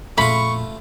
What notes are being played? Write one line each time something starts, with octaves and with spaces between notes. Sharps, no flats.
F2 A#2 A3 F4 B5 C#6